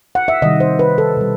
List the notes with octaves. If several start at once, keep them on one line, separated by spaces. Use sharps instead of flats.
F#5
E5
C3 D#3 G3 D#5
C5
B4
A4
B2 G3